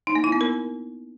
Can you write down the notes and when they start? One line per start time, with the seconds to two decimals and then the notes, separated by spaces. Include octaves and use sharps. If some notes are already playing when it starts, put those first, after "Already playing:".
0.07 D#4
0.15 A#3
0.24 E4
0.32 B3
0.41 A#4